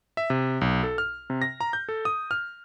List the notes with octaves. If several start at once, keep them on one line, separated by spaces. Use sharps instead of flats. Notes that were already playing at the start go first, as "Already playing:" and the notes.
E5
C3
B1
A4
F6
C3
A#6
A#5
G6
A4
D#6
F6